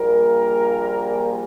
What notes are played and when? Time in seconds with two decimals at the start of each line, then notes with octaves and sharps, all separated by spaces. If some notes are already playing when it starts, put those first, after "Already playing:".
Already playing: A#1 A#2 G3 A#3 A#4